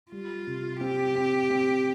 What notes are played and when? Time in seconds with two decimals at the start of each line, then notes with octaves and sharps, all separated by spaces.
0.12 G3 F4
0.47 C3
0.81 C4 G4
1.15 C4
1.50 C4